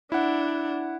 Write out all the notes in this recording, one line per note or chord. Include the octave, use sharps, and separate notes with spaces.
D4 E4 F#5